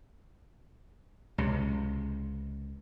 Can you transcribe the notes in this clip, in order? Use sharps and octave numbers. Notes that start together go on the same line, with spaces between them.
C#2 C3